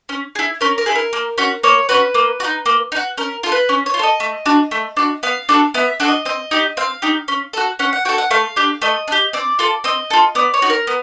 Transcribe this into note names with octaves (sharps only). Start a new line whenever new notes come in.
C#4
E4 G#4
C#4 A#4
A#4
E4 G#4
A#4
A#3
C#4 F#4
A#3 C#5
C#4 F#4 B4
A#3
F#4
D#4
A#3
D#4
F#4
C#4 A#4
F4 A4
B4
C#4
C#5
F4
A4 D#5
A3
D4 F#4
A3
D4 F#4
B3 F5
D4 F#4 A4
B3 E5
D4 F#4 A4
D#5
C4 D#5
D#4 G4
C4 F5
D#4 G4
C#4
F#4 A4
C#4 F#5
F#5
F#4 A4 G5
F#5
A3 F5
D4 G4
A3 D#5
D4
G4
C4 D5
F4 A4
C4 D#5
F4 A4
B3 D5
C#5
D#4 F#4
A#4
B3